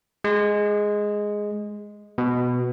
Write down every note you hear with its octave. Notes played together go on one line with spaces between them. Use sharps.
G#3
B2